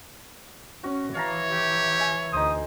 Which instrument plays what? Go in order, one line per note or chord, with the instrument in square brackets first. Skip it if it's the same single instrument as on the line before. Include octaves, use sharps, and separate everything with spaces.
[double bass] C#4 [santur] F#4
[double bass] E3 [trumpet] C#5 [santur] F5 A5 A#5
[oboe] G4
[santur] E5 G#5
[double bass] D2 [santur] D#4 C5 [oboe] D#6